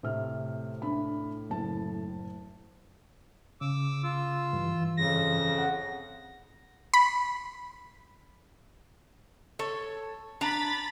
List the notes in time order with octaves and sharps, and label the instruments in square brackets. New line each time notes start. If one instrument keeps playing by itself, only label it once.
[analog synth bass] A2 [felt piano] C3 F6
[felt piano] D4 E5 B5
F#1 A5
[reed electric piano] C#3 [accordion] D6 E6
[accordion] F4 E6
[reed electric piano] G2 E3
[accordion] F2 C#3 [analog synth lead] A#6
[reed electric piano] F#5
[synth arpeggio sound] B5
[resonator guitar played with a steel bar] A4 C#5
[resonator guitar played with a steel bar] D4 A#5 [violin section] B5 A6